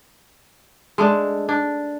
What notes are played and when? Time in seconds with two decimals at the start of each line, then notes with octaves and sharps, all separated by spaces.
0.98 G#3 A3 D4
1.49 D4